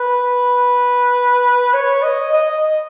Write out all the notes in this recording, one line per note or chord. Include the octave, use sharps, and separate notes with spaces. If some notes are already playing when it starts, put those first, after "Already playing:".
Already playing: B4
C#5
D#5
D#5